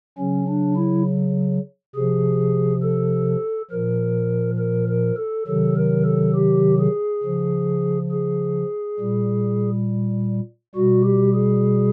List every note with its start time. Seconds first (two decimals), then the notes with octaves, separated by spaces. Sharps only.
0.18 C#3 F#3 C#4
0.47 D4
0.76 E4
1.95 C3 F3 G#4
2.83 A4
3.70 A#2 F3 A#4
4.58 A#4
4.88 A#4
5.17 A4
5.47 C3 D#3 F#3 A4
5.76 A#4
6.05 A4
6.35 G4
6.79 G#4
7.23 C#3 F3
8.11 G#4
8.99 A#2 G3
10.75 B2 G3 F#4
11.04 G4
11.34 G#4